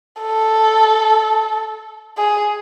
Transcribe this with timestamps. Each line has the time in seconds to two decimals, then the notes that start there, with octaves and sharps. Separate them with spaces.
0.22 A4
2.17 G#4